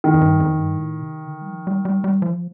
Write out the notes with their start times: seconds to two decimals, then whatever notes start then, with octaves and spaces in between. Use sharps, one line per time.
0.04 D#3
0.14 F2
0.21 G2
0.40 F2
0.58 G2
0.76 A2
1.01 C3
1.25 D3
1.42 G3
1.49 F3
1.67 G3
1.85 G3
2.04 G3
2.22 F3